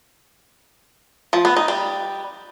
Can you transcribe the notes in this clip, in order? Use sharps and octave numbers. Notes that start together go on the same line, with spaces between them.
F3
B3
D#4
G3